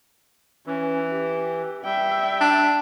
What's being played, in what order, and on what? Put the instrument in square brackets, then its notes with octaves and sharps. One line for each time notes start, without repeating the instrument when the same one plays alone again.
[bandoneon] E3 [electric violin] C#4
[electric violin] G4
[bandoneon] G3 [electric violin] E5 G5
[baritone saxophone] D4